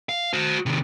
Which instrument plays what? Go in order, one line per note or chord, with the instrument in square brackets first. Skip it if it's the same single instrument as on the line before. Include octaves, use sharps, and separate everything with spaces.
[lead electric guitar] F5
F#4 C5
C3 D#3